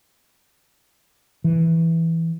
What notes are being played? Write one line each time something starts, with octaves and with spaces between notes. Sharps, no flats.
E3